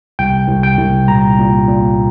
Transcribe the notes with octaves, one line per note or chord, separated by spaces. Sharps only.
C2 G5
C2
G5
C2
A#2 A#5
A#2
A#2